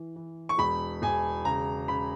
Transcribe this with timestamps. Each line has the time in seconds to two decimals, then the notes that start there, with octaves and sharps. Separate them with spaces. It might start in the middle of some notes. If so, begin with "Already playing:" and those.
Already playing: E3
0.16 E3
0.49 C#6
0.58 E1 B5
1.02 E1 G#5
1.45 C#3 A#5
1.88 C#3 B5